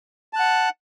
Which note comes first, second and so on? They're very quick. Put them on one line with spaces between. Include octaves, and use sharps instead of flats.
A5 F#6 F#5